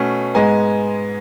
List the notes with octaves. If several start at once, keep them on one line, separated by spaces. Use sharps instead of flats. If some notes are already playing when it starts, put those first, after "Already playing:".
Already playing: B2 A3 C#4
G#2 G#3 B3 G#5